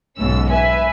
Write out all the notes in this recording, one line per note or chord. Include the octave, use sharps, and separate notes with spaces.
B1 G#2 B2 C#4 E6
B4 E5 G#5